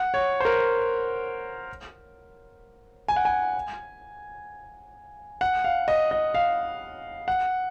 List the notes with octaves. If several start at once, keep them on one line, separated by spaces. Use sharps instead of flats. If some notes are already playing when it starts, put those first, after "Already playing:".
Already playing: F#5
C#5
C5
A#4
G#5
F#5
G#5
F#5
F5
D#5
D#5
F5
F#5